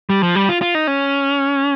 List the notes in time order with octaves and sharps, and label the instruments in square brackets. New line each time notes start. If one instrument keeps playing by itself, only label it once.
[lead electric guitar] G3
F3
G3
F4
F4
D#4
C#4